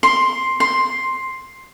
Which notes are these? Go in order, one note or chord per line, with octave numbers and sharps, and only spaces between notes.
C6
C6